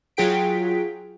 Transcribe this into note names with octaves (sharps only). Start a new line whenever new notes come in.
F#3 F4 G#4 G5 B6 D7